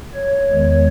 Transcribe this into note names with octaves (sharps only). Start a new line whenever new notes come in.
C#5
E2 D#3 G#3